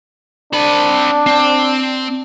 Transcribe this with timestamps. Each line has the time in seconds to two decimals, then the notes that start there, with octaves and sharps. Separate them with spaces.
0.53 C4 D4 B5
1.26 C4